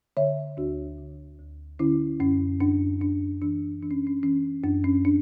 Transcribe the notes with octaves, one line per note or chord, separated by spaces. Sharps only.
D3 C#5 E5
D2 D4 F#4
D3
D2
D3 C#4 E4
F#2 C#4
F#2 D4
F#2 D4
E3 D4
E3 D4
C#4
C#4
E3 C#4
F#2 D4
C#4
D4